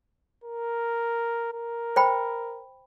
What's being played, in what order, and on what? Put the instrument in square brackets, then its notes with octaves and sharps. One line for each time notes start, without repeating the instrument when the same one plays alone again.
[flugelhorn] A#4
A#4
[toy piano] C5 G5 B5